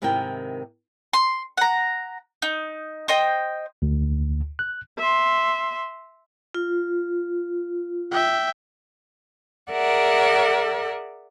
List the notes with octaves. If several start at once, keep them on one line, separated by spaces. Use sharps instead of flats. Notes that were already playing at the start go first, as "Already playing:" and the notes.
G#2 C3 D#3 E4 A#4 G5
C6
F#5 A#5
D#4
C5 D#5 G5
D2
F#6
E5 C6
F4
E5 G5
G#4 A#4 D5 E5 F#5